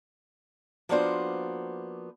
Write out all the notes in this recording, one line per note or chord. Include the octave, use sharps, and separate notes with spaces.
F3 A#3 B3 D4 F#4 C5